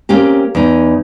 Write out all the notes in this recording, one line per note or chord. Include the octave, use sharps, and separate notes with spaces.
A#3 C4 C#4 G4
E2 D#4